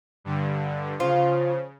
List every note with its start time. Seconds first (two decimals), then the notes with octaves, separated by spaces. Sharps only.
0.24 G2 D3
1.00 C#3 F3 F4